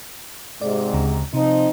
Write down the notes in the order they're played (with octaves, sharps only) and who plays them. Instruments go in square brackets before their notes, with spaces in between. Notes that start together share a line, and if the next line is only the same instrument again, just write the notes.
[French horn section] G#2 C3 G#3 [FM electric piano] D5
[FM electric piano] D2 C#3 A#5
[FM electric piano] C3 [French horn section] F3 C4 D#4